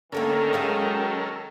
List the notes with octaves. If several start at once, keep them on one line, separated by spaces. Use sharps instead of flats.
D3 D#3 A3 A#3 C#4 A4 A#4
F#3 G#3 F5